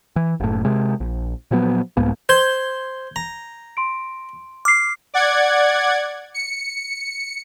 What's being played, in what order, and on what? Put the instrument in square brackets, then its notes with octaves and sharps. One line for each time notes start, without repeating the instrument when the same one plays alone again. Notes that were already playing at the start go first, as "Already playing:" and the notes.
[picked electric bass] E3
F#1 A2
C3 G#3
A#1
A#2 F3 F#3 B3
C2 G#2 A#3 B3
[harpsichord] C5 [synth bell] G6 G#6 G7
[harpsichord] A#5
[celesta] C6 D7
[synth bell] D6 [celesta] F6 C7
[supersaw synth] D5 F#5 G#6
C#7